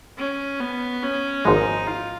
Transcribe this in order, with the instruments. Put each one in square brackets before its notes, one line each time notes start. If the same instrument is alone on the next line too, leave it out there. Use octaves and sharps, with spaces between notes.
[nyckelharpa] C#4
B3
C#4
[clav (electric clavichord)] G#1 G#2 F3 G#3 [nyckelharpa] D#4
[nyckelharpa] F4